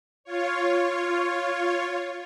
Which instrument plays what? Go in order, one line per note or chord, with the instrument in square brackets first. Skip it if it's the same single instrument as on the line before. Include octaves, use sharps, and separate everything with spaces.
[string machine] F4 C#5